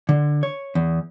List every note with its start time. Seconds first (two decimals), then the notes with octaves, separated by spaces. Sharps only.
0.09 D3
0.43 C#5
0.75 E2